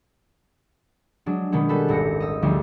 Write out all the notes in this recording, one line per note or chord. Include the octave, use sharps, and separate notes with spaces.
F#3 G#3 D4
B2 D#3 G#3 C#4
G3 A4 B4
D#1 G#1 A#6 C#7
D#5 E6
A1 D2 D3 F3 G3